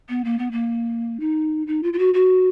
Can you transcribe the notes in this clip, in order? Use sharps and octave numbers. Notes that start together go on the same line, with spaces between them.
B3
A#3
B3
A#3
D#4
D#4
F4
F4
F#4
F#4